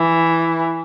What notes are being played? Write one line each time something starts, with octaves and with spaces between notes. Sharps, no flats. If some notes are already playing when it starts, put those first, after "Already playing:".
Already playing: E3